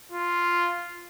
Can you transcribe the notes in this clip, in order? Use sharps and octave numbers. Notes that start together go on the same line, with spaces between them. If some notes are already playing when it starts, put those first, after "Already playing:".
F4